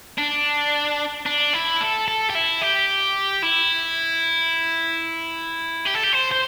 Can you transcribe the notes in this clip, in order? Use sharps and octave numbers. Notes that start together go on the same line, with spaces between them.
D4
D4
E4
A4
A4
G4
E4
G4
E4
G4
A4
G4
C5
C5